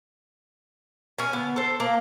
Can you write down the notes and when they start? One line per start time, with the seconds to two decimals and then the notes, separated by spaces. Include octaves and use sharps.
1.18 C#4 G#5
1.33 D3 B3
1.56 A4 C5
1.80 A#3